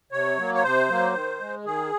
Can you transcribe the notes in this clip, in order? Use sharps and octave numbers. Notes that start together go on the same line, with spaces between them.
C3 C#5
F#3 A#3
C#5
C3 C5
F#3 A#3
D#3
G#3
D#3 G#4